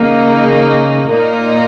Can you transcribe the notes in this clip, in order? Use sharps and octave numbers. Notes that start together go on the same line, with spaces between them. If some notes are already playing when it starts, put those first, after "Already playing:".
Already playing: C#3 A#3 D#4
A#2 A#3 D#4 A#4